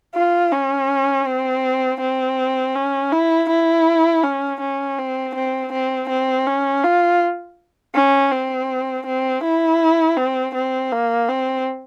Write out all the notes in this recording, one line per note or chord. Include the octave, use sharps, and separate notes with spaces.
F4
C#4
C4
C4
C#4
E4
E4
C#4
C#4
C4
C4
C4
C4
C#4
F4
C#4
C4
C4
E4
C4
C4
A#3
C4